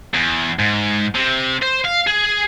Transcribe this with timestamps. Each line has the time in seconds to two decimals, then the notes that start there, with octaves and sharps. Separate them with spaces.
0.14 E2
0.59 G#2
1.15 C3
1.62 C5
1.85 F5
2.07 G#4